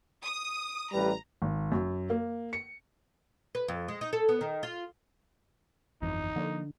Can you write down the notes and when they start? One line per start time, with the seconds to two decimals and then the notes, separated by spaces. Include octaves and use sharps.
0.23 D#6
0.92 A1 G3 B4 A#5
1.42 G#1
1.72 F#2
2.10 A#3
2.53 C#7
3.55 B4
3.68 F2
3.88 G#3
4.01 D#4
4.13 A4
4.29 B3
4.41 D#3
4.63 F4
6.02 G1 F2 E3 D#4
6.36 D3 F3 A#3